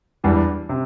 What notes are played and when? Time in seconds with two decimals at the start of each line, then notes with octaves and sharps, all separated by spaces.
0.24 E2 E3 G3 D4
0.69 C3